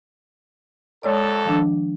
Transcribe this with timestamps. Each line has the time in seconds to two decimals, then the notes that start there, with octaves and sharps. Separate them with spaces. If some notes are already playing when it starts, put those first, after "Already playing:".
1.03 A#1 F2 G#3 A4 C#5 D5
1.45 D#3 F3 D4